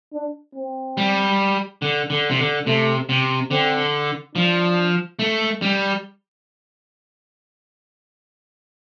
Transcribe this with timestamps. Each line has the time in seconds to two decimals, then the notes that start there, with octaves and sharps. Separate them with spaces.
0.13 D4
0.55 C4
0.97 G3
1.82 D3
2.10 D3
2.30 C3
2.39 D3
2.67 C3 A3
3.09 C3
3.51 D3 C4
4.35 F3 D4
5.19 A3
5.62 G3